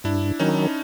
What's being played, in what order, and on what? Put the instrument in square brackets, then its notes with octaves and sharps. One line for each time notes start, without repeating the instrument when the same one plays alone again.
[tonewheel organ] G2 [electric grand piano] D4 E4
[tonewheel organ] D#3 F#3 [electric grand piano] C#4 D#4